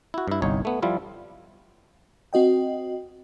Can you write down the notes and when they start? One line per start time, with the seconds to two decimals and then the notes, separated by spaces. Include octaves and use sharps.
0.14 E4 F#4
0.28 G2 E4
0.42 G1 C2 D#4 C#5
0.65 A3 B3
0.82 F3 G3 E4 F4
2.33 C4 F#4 D#5 G5